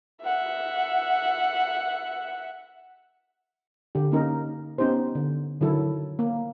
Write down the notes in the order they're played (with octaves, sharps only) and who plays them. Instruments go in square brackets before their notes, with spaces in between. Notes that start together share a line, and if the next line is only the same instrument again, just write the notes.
[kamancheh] E5 F#5
[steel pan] D3 G4
A#3 C#4 D#4 A#4
B3 C#4 D#4 G4 C5
D3
D3 D#3 F#3 E4 A4
A#3